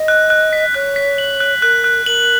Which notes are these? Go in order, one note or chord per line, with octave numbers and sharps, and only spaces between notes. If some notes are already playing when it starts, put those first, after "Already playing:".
Already playing: D#5
F#6
F#6
B6
C#5 F#6
B6
F#7
F#6
A#4 F#6
F#6
A#4 F#7